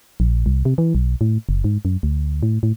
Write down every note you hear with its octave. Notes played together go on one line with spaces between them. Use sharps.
A#1
C2
C3
E3
B1
A2
F#1
G#2
F#2
D2
A2
A2